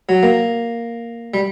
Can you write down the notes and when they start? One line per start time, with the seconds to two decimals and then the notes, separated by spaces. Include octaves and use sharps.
0.09 F#3
0.23 A#3
1.34 G3